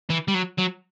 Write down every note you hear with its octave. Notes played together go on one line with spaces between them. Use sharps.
E3
G3
F#3
F#3